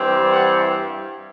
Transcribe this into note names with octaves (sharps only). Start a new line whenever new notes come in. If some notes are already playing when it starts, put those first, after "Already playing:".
Already playing: G2 E3 G3 C4
F#5